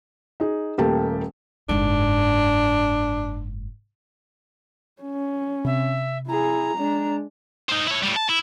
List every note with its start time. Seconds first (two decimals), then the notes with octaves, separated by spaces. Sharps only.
0.40 D#4 G#4
0.78 D#1 A3 A#3 G4 G5 A5
1.69 F#1 G#2 D4
5.02 C#4
5.65 C3 E5
6.28 E4 G#4 A#5
6.77 G#3 D4
7.70 D#4 C5
7.88 E4 C#5
8.04 A2 G3
8.16 A5
8.29 E4